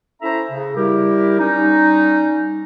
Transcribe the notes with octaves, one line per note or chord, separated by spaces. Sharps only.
C#4 E4 A4 C5 E5 A#5
C#3
G3 E4 G4 A#4
G3 C#4 D#4